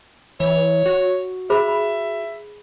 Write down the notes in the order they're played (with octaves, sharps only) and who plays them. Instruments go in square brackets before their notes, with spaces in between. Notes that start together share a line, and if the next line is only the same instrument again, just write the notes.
[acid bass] E3 [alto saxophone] C#5
[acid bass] F#4
[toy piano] G#4 C5 B5 [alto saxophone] E5
[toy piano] B5